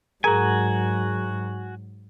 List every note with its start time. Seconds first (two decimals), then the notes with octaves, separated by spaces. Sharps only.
0.24 G#2 F#3 F#4 G#4 A#4 G#5 A#5